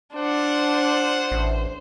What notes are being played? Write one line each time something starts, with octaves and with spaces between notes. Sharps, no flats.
D4 F4 C5 F#5
A1